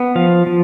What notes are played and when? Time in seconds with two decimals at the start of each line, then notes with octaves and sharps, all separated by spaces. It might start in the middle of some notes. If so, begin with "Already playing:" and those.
Already playing: B3
0.15 F3 F5
0.46 F3